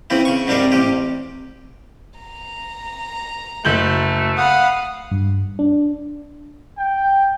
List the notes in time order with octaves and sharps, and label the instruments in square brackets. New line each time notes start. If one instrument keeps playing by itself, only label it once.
[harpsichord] C#3 E3 C4 E4
C#3 C#6
G#2 C3 G3 D4 A4 A#4
A1 C3 G4
[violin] A#5
[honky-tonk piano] F#1 G6 F#7 [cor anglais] A3
[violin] F5 B5 [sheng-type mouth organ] F#5 D#6
[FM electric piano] G2
D4
[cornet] G5